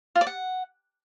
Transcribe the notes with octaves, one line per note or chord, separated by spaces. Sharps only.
F4
D5
F#5